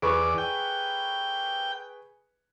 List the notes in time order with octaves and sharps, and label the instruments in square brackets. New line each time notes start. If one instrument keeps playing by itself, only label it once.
[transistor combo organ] E2 D5 [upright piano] G#4 B4 C#6
[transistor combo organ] G5